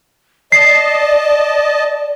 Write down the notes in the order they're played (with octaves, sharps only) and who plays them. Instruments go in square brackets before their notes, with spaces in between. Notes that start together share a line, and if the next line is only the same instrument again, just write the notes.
[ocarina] D5 [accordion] D#5 A5 [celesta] C7